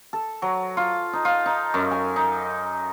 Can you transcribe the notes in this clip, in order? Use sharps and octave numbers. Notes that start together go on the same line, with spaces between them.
A4
F#3
F4
D#4
F4
D#4
F#2
G#5
D#4